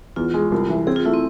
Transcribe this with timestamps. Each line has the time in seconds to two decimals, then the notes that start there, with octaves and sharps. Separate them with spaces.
0.16 E2 F4
0.34 G#3
0.52 C2
0.69 E3
0.87 C4 G#4
0.96 F4
1.05 A3 E4
1.14 C4